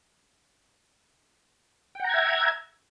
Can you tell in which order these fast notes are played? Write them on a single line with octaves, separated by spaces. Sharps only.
G5 F#5 A#5 G#6 E5